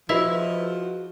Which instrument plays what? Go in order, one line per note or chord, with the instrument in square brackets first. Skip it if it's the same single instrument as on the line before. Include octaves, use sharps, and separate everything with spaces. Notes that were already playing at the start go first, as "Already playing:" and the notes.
[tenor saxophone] F3 [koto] E4 [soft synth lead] F#4 [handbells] G#4 B4 D#5